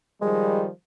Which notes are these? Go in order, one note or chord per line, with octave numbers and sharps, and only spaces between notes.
D#3 F3 G3 G#3